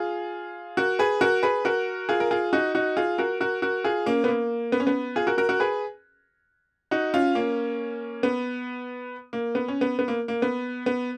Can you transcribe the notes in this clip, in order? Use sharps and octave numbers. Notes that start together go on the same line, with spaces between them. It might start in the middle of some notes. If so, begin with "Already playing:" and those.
Already playing: F4 G#4
F#4 A#4
G#4 B4
F#4 A#4
G#4 B4
F#4 A#4
F4 G#4
A#4
F4 G#4
D#4 F#4
D#4 F#4
F4 G#4
F#4 A#4
F#4 A#4
F#4 A#4
F4 G#4
A#3 C#4
B3
A#3
B3
C#4
B3
F4 G#4
F#4 A#4
F#4 A#4
F#4 A#4
G#4 B4
D#4 F#4
C#4 F4
A#3 C#4
B3
A#3
B3
C#4
B3
B3
A#3
A#3
B3
B3